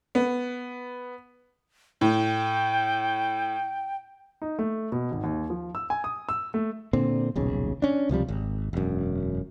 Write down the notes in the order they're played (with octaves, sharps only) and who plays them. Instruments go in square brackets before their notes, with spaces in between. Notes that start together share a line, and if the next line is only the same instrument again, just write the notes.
[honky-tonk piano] B3
[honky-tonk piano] A2 [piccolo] G5
[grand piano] D#4
A3
B2
G#1
D#2
F3
E6
G#5
D#6
E6
A3
[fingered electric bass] A#2 D3 C4
D#1 B1 C#3
C#4 D4
C#2 C3 F3 G3
G#1
E1 F#2